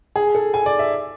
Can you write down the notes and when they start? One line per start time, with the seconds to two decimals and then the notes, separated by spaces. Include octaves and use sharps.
0.16 G#4
0.35 A4
0.54 G#5
0.66 D5
0.79 E5